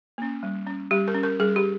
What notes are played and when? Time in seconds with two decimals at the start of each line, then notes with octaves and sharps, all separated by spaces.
0.18 A#3 C#4
0.43 G3
0.66 C#4
0.91 G3 G4
1.08 A#4
1.15 C#4
1.23 A#4
1.40 G3 G#4
1.56 G4